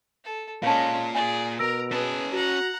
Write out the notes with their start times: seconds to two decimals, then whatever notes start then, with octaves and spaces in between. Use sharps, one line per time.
0.24 A4
0.63 A#2 G#3 C#4 F5 A5
1.15 G#4 D5 G#5
1.59 B2 A#4 A#5 E6 A#6 D7
1.91 B3 C#4 G#4 A5
2.33 F#4 F#5 A#5